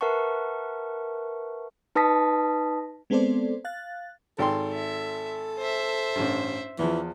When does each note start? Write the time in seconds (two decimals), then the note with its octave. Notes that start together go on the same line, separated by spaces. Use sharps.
0.01 A#4 B4 E5 F#5 A5 C#6
1.95 D#4 B4 A5 D#6 A#6 B6
3.10 G#3 B3 C4 A4 C5 D5
3.65 F5 F#6 A6
4.38 G#1 A4 G5 C6
4.73 E5
5.58 C5 E5
6.15 A1 G2
6.79 E2 E3 F3